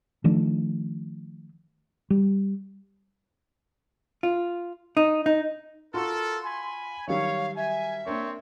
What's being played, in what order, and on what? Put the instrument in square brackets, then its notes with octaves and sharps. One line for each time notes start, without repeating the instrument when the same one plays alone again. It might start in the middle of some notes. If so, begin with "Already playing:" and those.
[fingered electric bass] D#3 F3 A3 D4
G3
[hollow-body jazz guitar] F4
D#4
D#4
[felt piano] F4 F#4 [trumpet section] A4 A#4 [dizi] C6
[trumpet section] G#5 B5
[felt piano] D#3 F#3 G3 [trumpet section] C#5 [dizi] F5
[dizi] E5 [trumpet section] G#5
[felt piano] A#3 D4 A#4 [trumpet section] C4 C#5